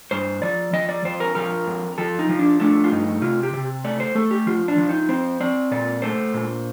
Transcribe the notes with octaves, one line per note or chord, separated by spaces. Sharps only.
G2 C5
F3 D5
F3 D#5
D5
F2 C5
A#4
F3 A#4
F2
F3 A4
D#4
F3
D4
A3 D4
F4
G2 D#4
C3 F4
G4
C3
A3 D5
C5
A3 A4
G4
F3 F4
D4
F3
D#4
C4 C5
C4 D5
A#2 D5
A3 C5
A#2